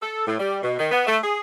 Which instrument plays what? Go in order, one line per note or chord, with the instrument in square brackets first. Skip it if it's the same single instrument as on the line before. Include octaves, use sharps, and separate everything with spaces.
[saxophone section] A4
A2
G3
B2
D#3
B3
A3
G#4